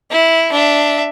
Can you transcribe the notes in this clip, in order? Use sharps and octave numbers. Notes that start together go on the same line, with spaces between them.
E4
D4 E5